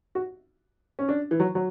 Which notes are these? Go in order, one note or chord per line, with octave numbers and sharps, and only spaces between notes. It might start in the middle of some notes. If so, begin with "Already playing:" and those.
F#4
C#4
D4
E3
F#3
F#3